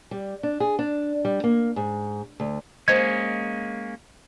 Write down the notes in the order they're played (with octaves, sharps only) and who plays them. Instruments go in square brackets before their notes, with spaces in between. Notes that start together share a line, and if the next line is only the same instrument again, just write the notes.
[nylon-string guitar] G3
D4
G#4
D4
G3
A#3
G#2
D2
[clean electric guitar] G#3 A#3 C#4 [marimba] C5 D#5 [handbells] G#6